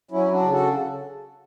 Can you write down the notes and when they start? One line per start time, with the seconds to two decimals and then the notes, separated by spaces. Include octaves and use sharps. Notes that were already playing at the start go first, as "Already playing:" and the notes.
0.11 F#3 C#4 E4
0.31 D4 F#4
0.41 C#3
0.51 F#4 A4